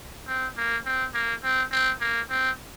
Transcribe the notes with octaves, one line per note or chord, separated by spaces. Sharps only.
C4
A#3
C4
A#3
C4
C4
A#3
C4